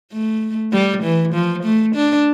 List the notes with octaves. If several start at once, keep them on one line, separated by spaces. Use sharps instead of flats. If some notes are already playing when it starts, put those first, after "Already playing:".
A3
G3
E3
F3
A3
D4